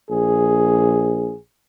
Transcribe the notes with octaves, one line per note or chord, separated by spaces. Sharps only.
A#1 G#4